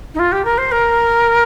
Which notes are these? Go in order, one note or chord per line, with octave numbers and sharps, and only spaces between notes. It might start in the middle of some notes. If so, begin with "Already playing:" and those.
D#4
F4
G4
A#4
C5
A#4